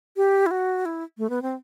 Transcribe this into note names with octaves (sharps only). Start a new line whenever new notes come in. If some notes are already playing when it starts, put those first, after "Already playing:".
G4
E4
F#4
E4
A3
B3
C4